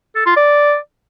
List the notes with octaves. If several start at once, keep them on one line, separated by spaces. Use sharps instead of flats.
A4
F4
D5